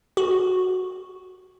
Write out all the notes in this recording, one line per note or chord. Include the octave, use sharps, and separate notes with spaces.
F#4